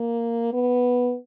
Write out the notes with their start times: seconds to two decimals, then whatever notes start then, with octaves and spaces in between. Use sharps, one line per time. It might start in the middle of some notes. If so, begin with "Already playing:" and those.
Already playing: A#3
0.53 B3